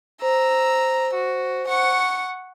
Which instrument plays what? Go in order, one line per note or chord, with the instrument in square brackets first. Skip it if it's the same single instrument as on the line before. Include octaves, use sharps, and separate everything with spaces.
[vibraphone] C5 [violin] A#5 E6
[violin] F#4
F#5 C#6